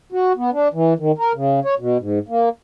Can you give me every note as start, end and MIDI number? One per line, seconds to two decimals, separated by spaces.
0.12 0.33 66
0.37 0.50 59
0.53 0.68 62
0.74 0.94 52
0.99 1.12 51
1.18 1.32 70
1.35 1.60 49
1.65 1.75 73
1.79 1.97 47
2.00 2.19 44
2.28 2.49 58